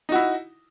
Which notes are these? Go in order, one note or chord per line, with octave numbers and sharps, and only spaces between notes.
D#4 E4 F#4